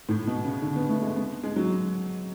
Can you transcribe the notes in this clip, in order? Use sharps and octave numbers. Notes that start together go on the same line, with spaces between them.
A2
B2
C#3
D3
B3
A3
G#3
B3
G#3
F#3